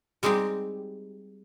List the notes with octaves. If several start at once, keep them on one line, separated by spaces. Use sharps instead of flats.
G3 G#3 C4 D#4 G4